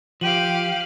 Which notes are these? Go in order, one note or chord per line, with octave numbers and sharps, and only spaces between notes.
F3 G4 F5 D7 D#7 F#7